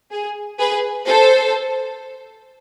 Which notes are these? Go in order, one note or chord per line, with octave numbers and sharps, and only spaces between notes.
G#4
G#4 B4
A4 C5